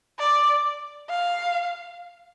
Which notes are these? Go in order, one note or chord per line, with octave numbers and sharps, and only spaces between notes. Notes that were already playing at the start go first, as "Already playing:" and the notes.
D5
F5